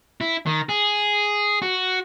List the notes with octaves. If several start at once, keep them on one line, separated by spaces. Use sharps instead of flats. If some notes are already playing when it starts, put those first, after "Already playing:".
E4
D#3
G#4
F#4